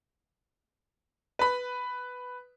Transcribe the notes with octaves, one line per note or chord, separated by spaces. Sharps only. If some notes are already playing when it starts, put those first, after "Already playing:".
B4 B5